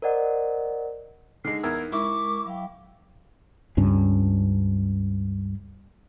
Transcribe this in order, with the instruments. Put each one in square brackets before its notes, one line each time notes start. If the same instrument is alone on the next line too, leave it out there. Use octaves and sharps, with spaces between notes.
[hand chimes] A#4 C5 D5 D#5 F#5
[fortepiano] D3 G#3 [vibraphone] D#4 [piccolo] C7
[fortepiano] E2 A#4 E6 [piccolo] G#6
[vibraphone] G#3 A#4 [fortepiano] E4 [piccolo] C#6 [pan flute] D6
[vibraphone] F#3 F5 G5
[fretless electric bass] C#2 G2 C#4 D4